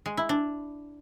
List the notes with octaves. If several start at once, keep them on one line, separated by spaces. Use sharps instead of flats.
G#3
E4
D4